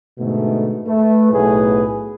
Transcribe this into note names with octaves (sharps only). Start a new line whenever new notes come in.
G#2 B2 D3 A3
A3 B4
B1 A2 A3 B3 G#4 B4